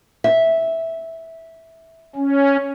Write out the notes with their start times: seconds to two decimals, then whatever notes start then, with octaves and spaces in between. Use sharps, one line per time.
0.24 E5
2.16 C#4